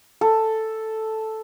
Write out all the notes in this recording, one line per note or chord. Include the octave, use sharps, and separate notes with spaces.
A4